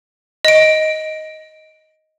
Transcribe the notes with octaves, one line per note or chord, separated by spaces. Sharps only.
D#5 D7